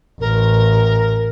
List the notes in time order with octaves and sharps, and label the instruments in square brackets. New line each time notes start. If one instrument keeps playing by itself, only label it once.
[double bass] A1 [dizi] A#4